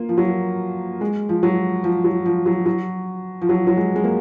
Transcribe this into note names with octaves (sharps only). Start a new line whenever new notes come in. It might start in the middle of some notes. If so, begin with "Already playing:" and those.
Already playing: A#3 F4
F3
F#3
G#3
F3
F#3
F3
F#3
F3
F#3
F#3
F3
F#3
F#3
G#3
G#3
A#3